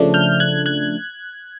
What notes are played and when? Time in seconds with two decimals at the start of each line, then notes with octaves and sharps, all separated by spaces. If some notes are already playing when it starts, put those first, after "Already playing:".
Already playing: C#3 F3 A3 D4
0.14 F6 G6
0.40 F#6 G#6
0.66 F#6 G#6